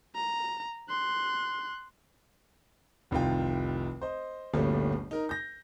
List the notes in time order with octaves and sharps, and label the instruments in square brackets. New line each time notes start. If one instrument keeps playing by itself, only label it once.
[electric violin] A#5
C6 F#6
[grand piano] F1 C2 D#3 F4 G5
C5 D#5
D1 G1 A#2 G3 A3 C#4
D#4 A#4
G6 A#6